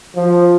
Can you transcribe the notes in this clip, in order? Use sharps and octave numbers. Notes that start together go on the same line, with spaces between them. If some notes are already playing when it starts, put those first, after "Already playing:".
F3